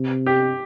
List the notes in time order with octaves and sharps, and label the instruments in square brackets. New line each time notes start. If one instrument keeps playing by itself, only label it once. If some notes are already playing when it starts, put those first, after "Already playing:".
Already playing: [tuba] C3
[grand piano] G4